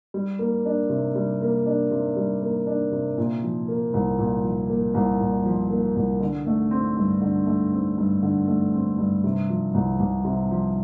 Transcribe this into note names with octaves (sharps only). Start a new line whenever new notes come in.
G3
A#3
D4
C3
G3
A#3
D4
C3
G3
A#3
D4
C3
A#2
F3
A#3
C2
A#2
F3
A#3
C2
A#2
F3
A#3
C2
D3
A3
C4
G2
D3
A3
C4
G2
D3
A3
C4
G2
C3
F3
C2
C2
C3
F3